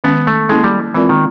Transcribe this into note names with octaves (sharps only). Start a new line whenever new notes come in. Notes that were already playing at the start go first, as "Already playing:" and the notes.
D#3 G#3 B3 C#4
A3
G#3 A#3 C#4 E4 A4
G3
E3 G#3 C4 F4 A#4 D5
D#3